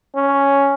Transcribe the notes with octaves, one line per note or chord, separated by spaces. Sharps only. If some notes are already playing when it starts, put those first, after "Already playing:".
C#4